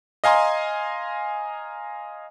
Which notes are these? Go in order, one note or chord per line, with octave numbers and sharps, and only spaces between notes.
D#5 F5 G#5 A#5 C6